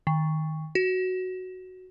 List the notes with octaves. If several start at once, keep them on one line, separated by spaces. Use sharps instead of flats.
D#3
F#4